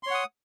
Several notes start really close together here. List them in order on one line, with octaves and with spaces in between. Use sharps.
C6 C#5 F#5 D#6